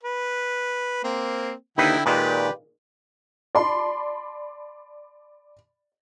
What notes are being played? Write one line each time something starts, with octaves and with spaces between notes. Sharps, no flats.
B4
A#3 C4
D#2 D3 D#4 E4 B4 G5
A#2 D#3 G#3 G4 B4 D5
D5 A5 B5 C6